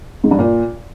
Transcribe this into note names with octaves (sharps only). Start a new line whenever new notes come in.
G#2
G2
A#2